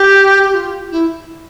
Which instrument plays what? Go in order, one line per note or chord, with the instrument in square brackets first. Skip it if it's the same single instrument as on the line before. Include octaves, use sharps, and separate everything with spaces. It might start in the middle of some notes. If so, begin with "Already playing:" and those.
Already playing: [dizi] G4
G4
F4
E4